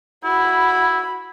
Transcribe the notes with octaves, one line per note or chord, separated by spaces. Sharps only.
E4 F#4 B5